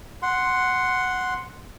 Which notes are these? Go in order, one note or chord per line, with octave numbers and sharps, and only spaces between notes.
F#5 C6